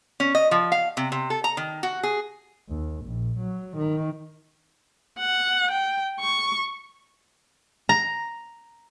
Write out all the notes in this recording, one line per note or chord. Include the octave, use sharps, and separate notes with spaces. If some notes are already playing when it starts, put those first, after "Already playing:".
C#4
D#5
F3
F5
C3
C3
A4
A#5
D#3
F#4
G#4
D#2
A#1
F#3
D#3
F#5
G5
C#6
A#5